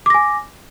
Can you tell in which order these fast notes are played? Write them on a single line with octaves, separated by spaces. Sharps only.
D6 A#6 G#5